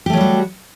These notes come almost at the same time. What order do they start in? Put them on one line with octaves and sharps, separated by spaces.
G4 A3 F#3 G3 F#4